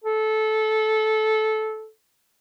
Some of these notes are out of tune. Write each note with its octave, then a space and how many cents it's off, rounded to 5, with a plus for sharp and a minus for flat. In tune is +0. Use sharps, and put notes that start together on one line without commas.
A4 -15